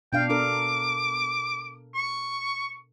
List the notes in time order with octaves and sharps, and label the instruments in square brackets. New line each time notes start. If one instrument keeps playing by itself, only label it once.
[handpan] B2 D4 F5 [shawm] G5
[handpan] D4 A4 A#4 [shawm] D6
[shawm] C#6